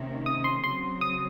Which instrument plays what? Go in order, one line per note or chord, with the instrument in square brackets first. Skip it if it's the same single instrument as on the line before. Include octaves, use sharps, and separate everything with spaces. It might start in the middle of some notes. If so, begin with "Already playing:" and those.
Already playing: [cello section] C3 D#3 A#3 C#4
[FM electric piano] D#6
C6
[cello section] C#3 F#3 C4 [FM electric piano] C6
[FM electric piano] D#6